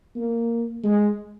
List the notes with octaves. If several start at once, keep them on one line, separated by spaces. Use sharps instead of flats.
A#3
G#3